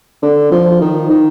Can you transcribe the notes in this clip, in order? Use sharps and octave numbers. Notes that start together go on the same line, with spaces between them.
D3
F3
D#3
D#3